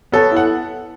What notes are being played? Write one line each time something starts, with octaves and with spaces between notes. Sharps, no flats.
B3 A4 C#5
E4
F#5